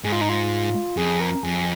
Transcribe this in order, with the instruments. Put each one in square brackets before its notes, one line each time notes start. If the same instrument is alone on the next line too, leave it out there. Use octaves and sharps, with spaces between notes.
[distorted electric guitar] G#2 [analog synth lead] G#4
[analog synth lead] F4
D#4
F4
[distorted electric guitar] F2 [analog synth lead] G#4
[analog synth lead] A#4
[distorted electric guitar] F2 [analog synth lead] G#4